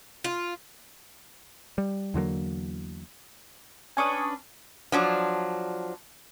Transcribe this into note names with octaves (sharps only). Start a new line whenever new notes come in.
F4
G3
E2 D3 F#3 A#3
C#4 D4 B4 G#5 C#6 D#6
F3 F#3 D4